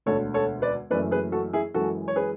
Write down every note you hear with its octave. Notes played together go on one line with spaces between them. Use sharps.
E1 D2 D3 A4 C#5
A4 C#5
B4 D5
F#1 F#2 E3 A3 B4 D5
G#4 B4
F#4 A4
E4 G#4
F#2 E3 G#3 F#4 A4
C#5
G#4 B4